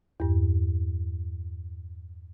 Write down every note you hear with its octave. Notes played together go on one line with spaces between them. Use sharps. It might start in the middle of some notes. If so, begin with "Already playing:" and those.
E2 G2